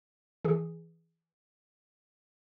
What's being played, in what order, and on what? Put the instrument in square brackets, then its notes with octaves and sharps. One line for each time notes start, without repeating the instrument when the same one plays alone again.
[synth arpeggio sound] E3 G#4